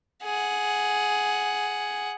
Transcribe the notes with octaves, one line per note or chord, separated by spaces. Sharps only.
G#4 F#5